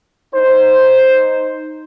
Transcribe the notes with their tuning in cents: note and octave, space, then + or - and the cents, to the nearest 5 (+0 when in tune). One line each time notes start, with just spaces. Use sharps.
D#4 +0 C5 +0